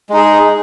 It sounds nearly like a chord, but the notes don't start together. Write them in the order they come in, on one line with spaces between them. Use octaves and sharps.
G#3 D#4 G#4